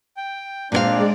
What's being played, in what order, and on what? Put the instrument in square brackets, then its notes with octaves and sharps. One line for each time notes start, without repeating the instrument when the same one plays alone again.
[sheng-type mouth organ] G5
[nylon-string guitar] A#2 B4 F5 [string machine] G#3 D5 [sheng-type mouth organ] C4 D4